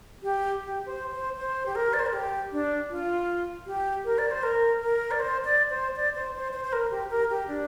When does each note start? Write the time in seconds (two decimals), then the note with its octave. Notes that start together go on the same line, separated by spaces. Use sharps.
0.23 G4
0.61 G4
0.86 C5
1.12 C5
1.37 C5
1.66 G4
1.75 A#4
1.93 D5
1.99 C5
2.06 A#4
2.13 G4
2.52 D4
2.90 F4
3.67 G4
4.05 A#4
4.18 D5
4.31 C5
4.43 A#4
4.81 A#4
5.11 D5
5.20 C5
5.45 D5
5.70 C5
5.96 D5
6.15 C5
6.35 C5
6.53 C5
6.65 C5
6.73 A#4
6.91 G4
7.10 A#4
7.30 G4
7.48 D4